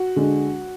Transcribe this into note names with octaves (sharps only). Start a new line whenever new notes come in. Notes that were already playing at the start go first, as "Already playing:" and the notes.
Already playing: F#4
D3 G#3